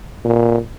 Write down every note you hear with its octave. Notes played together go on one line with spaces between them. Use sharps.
A#2